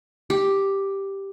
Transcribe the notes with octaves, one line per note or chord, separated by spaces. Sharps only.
G4